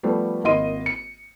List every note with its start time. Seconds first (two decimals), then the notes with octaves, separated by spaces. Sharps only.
0.03 F3 G3 A3 B3
0.44 G#1 A#3 E4 D#5 C6 D#7
0.86 C#7